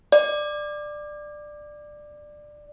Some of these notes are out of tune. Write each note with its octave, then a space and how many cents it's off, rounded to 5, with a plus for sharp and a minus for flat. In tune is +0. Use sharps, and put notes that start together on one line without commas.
D5 +15